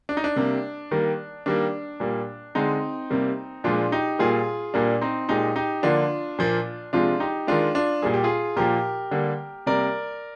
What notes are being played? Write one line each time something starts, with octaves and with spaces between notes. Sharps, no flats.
D4
D#4
D4
C3 G3 A#3
D#3 G3 A#3
D#3 G3 A#3 D4
A#2 G3 A#3
D3 G#3 C4 D#4
C3 G3 A#3
A#2 F3 G#3 D4 F4
D#4 G4
A#2 G3 A#3 F4 G#4
A#2 G3 A#3 D4
C4 D#4
A#2 G#3 D#4 G4
D#4 G4
D3 F3 A#3 D4 F4
A#2 F3 A#3
C3 F3 G#3 D4 F4
D#4 G4
D#3 G#3 D4 F4
D4 F4
A#2 G3 A#3 G#4
G4
F4 G#4
A#2 F3 A#3 G4 A#4
D3 G3 A#3
C3 G3 A#3 A#4 D5